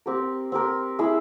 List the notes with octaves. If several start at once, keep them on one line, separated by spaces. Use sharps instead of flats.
C4 G4 A#4
C4 G4 A#4
E4 G#4 E5